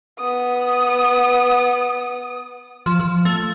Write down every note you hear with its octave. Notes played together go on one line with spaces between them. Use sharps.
B3 D#6
F3
F3
A3